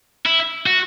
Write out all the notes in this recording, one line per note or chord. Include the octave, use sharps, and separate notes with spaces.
E4
F#4